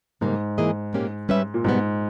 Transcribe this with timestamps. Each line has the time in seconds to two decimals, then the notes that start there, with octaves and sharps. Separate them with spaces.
0.21 G#2 C#3 G3 A#3 D#4
0.58 E3 A#3 E4 G#4 D#5
0.93 A#2 A#3 C#4 G4
1.29 G3 C#4 G4 B4 E5
1.54 A#2
1.64 G#2 B2 G3 B3